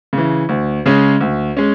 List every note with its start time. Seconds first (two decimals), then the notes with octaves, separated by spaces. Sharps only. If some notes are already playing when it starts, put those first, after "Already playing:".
0.13 C#3 E3
0.49 D2
0.86 C#3 G#3 C#4
1.21 D2
1.57 G#3 C#4